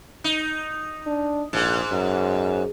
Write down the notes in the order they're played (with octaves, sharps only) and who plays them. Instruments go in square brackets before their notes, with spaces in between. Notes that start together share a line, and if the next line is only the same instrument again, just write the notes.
[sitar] D#4
[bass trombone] D4
[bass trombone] A#1 [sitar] G#2
[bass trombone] F#2